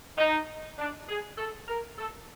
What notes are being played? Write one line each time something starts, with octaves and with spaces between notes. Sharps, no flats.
D#4
D4
G#4
A4
A#4
A4